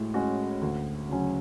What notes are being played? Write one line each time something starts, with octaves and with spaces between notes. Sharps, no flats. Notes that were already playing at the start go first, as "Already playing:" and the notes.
Already playing: A2 G#3 F#4
G#3 C#4 F#4
D2
C#3 F#3 C#4